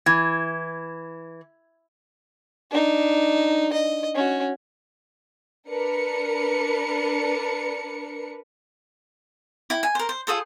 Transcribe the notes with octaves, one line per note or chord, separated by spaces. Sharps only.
E3 G#6
D4 D#4
D#5
C#4 F#4
D4 A#4 B4 C#7
E4 G5
G#5
A#4 C5
C5
F4 G#4 A4 C5